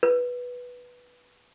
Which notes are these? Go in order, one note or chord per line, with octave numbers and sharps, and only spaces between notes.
B4